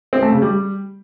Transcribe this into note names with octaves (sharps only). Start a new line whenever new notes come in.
C4
A3
C#3
G3